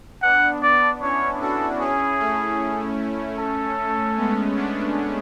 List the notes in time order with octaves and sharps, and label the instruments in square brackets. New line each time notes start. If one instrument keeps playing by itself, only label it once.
[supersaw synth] B3 D4 [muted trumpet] F#5
[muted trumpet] D5
[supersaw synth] C#4 E4 [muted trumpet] C#5
[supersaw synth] D4 F#4 [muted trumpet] A4
[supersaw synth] C#4 E4 [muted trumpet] G#4
[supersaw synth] A3 C#4
[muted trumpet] A4
[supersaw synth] G#3 B3
B3 D4